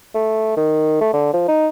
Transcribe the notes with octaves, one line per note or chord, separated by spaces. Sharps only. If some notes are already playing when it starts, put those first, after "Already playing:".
A3
D#3
A3
D3
F3
D#4